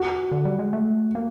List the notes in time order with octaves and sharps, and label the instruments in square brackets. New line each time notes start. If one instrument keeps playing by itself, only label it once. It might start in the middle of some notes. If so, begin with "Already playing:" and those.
Already playing: [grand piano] F#4
[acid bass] D3
G3
G#3
A3
A#3